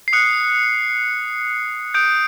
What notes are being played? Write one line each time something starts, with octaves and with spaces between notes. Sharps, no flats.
C7
D#6 F#6 C#7
D#6 G6 D7